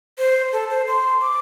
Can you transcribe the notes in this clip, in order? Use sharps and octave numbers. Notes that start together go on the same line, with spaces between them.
C5
A4
C5
C6
D6